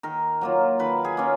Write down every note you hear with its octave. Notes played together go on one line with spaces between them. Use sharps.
D#3 A#4
F#3 A#3 F4
D#3 B4
G#4
A#3 C#4 F4